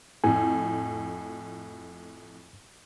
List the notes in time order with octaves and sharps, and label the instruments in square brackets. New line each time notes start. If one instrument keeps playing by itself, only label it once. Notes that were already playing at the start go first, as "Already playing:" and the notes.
[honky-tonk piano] F2 A2 [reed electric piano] G#5